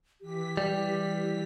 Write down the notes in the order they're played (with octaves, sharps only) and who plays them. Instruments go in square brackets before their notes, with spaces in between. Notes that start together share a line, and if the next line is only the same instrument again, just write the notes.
[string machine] E3 B6 [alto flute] G4
[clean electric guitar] G3